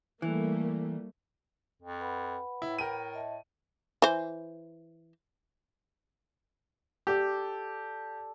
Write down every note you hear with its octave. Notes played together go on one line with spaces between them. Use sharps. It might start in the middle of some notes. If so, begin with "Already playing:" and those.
E3 G3 A3 A#3
F2
B4 F#5 B5
A2 E4
A#4 G5 D#7
D#5 E5 A5
E3 C5
G4 A4 D5